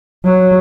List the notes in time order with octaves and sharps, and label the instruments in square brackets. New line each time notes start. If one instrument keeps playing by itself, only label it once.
[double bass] F#3